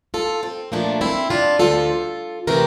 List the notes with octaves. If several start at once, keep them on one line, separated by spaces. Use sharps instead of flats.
F4 A4
C4
A#2 F3 A3 A#3 D4
C4 E4
D4 F4
D2 D3 F3 F4 A4
C3 E3 A3 G4 A#4